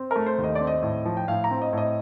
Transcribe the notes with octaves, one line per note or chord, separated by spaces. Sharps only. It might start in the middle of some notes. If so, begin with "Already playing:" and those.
Already playing: C4
A3 A#4
C5
D#2
D#5
D5
C4
D#5
A2
F3
G5
A2 F5
A#5
C4
D#5
A2 D#5